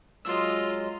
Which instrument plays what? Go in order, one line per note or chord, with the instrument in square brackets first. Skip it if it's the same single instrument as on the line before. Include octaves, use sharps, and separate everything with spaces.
[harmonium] F#3 G#3 [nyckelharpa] F4 D#5 [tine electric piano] C6 E6